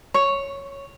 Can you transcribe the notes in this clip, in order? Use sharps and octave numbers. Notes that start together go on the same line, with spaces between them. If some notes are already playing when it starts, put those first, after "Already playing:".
C#5